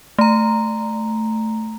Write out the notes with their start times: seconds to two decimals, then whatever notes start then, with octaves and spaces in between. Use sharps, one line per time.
0.19 A3 A#5